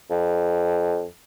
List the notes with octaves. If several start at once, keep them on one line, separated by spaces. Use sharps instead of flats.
F2